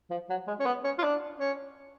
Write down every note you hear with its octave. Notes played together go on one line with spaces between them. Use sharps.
F3
F#3
G#3
C#4
B3
C#4
F4
D4
C#4